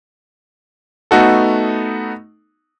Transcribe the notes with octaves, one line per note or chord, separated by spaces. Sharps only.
A3 B3 D#4 F#4 A4